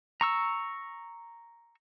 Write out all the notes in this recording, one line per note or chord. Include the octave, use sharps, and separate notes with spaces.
A#5 C#6 E6